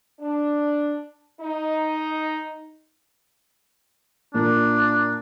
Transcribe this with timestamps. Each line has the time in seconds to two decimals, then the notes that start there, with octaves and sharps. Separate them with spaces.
0.19 D4
1.40 D#4
4.34 A#2 A#3 D4